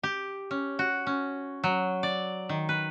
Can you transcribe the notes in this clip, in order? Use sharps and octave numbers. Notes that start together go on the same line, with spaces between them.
G4
C#4
F#4
C#4
F#3
D5
D#3
B4